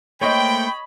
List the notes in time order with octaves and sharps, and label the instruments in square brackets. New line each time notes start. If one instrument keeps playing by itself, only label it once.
[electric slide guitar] A3 A#3 C5 [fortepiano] C#5 D#5 [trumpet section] G5 [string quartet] B5